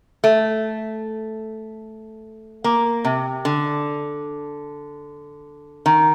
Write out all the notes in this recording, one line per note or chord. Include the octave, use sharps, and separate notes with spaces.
A3
A#3
C3
D3
D#3